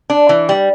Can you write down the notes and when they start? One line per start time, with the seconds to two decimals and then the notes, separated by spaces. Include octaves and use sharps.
0.10 D4
0.29 E3
0.49 G3